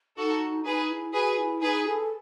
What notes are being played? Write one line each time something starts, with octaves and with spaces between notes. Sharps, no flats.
D#4 F#4 A4
D#4 G#4 B4
E4
F#4 G#4 B4
E4
D#4 G#4 B4
A4